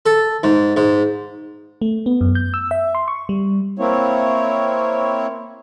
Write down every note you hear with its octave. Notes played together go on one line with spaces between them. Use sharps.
A4
G#2
G#2
A3
B3
F#2
G6
E6
E5
C6
C#6
G3
A#3 C4 E4 C#5